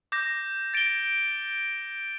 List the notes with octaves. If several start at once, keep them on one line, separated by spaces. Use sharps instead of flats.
D6 G6 A#6
A6 D7 G7